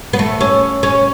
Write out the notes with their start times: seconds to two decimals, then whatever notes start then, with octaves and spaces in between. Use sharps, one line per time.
0.13 B3
0.19 A3
0.41 C#4
0.83 C#4